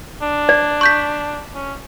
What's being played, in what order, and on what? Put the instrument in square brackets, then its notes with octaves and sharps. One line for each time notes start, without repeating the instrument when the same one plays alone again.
[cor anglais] D4
[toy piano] D5
[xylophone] C#6 G6 B6
[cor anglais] C#4